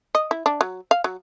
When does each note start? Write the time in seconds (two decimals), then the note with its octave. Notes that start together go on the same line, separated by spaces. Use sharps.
0.15 D#5
0.31 E4
0.46 D4
0.61 F#3
0.91 F5
1.04 F#3